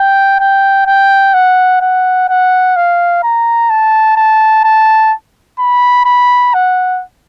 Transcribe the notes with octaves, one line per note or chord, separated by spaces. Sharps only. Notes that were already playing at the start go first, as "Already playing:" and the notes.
Already playing: G5
G5
G5
F#5
F#5
F#5
F5
A#5
A5
A5
A5
B5
B5
F#5